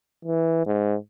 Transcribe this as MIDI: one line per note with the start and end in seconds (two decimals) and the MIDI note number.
0.25 0.65 52
0.66 0.96 44